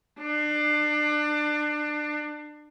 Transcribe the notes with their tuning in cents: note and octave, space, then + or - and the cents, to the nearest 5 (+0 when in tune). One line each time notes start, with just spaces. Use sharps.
D4 +30